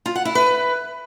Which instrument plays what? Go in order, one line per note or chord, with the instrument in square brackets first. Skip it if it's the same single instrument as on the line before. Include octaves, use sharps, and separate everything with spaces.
[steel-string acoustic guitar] F4
F#5
E4
B4